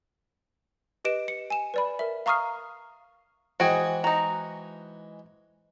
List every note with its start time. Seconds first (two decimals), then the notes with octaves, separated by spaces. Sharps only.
1.05 G4 B4 D#5 D7 E7
1.28 C#7
1.50 G#5 E7
1.74 B4 D5 B5
1.99 A#4 E5
2.26 F5 A#5 C#6 D#6 F6 C7
3.60 E3 G#3 F#4 G#4 C5 G5
4.04 D#4 F#4 A#5